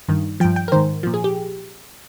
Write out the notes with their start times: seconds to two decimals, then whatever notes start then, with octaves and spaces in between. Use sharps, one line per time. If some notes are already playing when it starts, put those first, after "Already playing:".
0.08 G2 D#3
0.40 G2 F3 G5
0.56 G5
0.68 A#4
0.72 G#2 D#3 C5
1.03 A#2 F3
1.14 G#4
1.24 G4